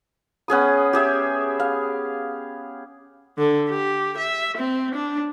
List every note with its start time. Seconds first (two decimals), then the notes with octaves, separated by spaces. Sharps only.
0.48 B3 C#4 G#4 D#6
0.93 G4 G#4 E5
1.60 F5
3.38 D3
3.69 G4
4.18 E5
4.57 C4
4.95 D4